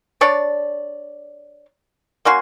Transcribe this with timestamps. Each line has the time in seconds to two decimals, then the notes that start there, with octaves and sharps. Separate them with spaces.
0.21 D4 C#5 D5
2.25 A#3 C#4 F#4 C6